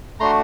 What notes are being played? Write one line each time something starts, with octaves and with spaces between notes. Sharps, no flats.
A3 D4 F#4 A#5 C6